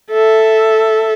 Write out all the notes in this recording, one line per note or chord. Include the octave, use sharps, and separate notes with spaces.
A4 E5